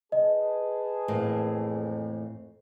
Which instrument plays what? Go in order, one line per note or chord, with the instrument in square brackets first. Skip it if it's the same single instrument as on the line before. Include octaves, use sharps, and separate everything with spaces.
[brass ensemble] G#4 B4 A5 [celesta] D#5
[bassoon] F2 [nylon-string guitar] A2 E3 A#3